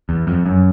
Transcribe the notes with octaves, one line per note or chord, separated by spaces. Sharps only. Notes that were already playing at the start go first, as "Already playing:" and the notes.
E2
F2
F#2